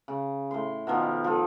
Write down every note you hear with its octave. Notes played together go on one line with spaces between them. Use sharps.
C#3
A2 C6
B2 D#3 F3
F3 A4